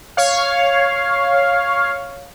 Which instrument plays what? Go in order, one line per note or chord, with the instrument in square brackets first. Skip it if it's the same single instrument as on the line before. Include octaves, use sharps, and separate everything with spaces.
[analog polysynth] C#5 F5